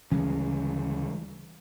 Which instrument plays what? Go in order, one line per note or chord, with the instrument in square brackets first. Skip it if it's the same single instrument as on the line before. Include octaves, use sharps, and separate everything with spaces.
[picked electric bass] D2 C#3 C#4 [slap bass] E3 G3 G#3